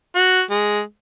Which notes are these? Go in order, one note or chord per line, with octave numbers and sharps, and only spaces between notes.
F#4
G#3